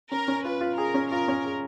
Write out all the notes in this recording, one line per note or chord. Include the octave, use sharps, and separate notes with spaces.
C#4 A#4
C#4
F4 B4
F4
G#4 A#4
C#4
F4 A#4
C#4
G#4